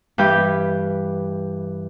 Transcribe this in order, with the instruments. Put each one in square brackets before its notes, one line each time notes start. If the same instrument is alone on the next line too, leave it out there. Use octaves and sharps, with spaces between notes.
[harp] G2 E3 G4 G6